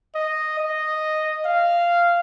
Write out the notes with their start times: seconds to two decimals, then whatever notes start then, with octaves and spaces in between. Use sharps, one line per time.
0.15 D#5
0.59 D#5
1.45 F5